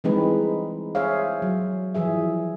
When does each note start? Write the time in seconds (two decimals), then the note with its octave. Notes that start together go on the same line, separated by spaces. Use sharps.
0.04 E3 G3 G#3 C4 D#4 B4
0.95 G#4 C5 C#5 E5 F5
1.42 F#3
1.95 E3 F3 G#4 E5